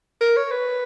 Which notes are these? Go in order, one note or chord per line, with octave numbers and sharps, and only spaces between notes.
A#4
C#5
B4